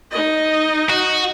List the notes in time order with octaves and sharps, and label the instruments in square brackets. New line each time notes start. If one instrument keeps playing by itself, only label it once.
[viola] D#4 D#5
[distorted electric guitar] F#4